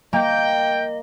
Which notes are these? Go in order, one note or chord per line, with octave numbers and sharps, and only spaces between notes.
A#3 D#5 G5